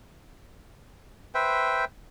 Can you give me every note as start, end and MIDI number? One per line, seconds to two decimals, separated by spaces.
1.35 1.85 71
1.35 1.85 72
1.35 1.85 76
1.35 1.85 79